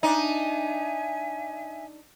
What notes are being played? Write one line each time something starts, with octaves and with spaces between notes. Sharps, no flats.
D4 D#4 E5 G#5